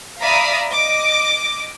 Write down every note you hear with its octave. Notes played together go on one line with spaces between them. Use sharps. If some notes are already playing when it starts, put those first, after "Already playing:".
D5 E5 F5 A#5 B5 D#6
D#5 D6